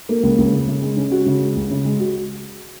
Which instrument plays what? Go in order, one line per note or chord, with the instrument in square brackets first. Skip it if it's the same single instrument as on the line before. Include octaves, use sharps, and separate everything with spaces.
[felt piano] A#3
C#2
C#2
C#3
C#3
G#3
C#4
F#4
C#3
G#3
C#2
C#3
G#3
F#4